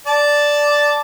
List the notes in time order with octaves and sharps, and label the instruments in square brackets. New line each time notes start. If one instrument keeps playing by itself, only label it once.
[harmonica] D5 A5